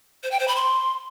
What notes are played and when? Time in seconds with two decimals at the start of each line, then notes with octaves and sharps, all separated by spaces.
0.23 C5
0.31 G5
0.40 C5
0.48 B5
0.56 C6